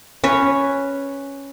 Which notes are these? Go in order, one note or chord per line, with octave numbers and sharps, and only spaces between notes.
C#4 B4 C#5